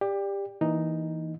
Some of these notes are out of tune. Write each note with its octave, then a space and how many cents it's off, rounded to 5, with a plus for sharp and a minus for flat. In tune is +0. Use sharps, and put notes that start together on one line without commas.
G4 +20 D5 +0
E3 -10 A#3 +0 D#4 +0